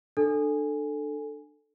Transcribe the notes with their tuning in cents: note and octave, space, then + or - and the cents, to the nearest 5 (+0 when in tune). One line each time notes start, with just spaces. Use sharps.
D4 +25 A4 +0 G#5 -5